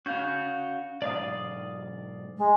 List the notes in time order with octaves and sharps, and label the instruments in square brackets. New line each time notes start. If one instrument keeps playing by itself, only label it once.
[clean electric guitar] C#4 F5 [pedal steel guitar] F#4 G6
[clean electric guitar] B1 G#2 [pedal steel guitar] D5 F5 D#6
[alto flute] G#3